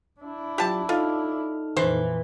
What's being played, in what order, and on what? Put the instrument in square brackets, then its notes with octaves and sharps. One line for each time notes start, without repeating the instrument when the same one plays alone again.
[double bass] D4 E4
[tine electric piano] F#3 F4 [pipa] G4 A5
[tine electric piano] D#4 A4 F6 [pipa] F4
[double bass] F2 A#2 [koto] E3 [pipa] C5